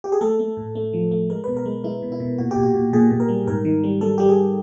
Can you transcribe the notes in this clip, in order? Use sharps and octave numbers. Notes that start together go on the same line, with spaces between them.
G4
G#4
A3 A4
A3
A2
A3
F3
A3
G#3 A#4
B2 B4
A#4
G#3
G#3 E4
B2
E4
B2
A#2 F#4
G4
A#2
F#4
A#2
A#2 G#4
A#2
A#4
G3
G#2 A#4
D#3
G3
G3 A4
G3 G4
G#4